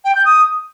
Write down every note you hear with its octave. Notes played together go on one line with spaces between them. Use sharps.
G5
G6
D#6